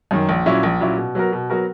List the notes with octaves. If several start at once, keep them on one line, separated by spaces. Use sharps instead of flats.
F#2 D#3
A#1
A#2 F#3 C#4 E4
A#1
A#2 F#3 C#4 E4
B2
F#3 B3 F#4 A#4
B2
F#3 B3 F#4 A#4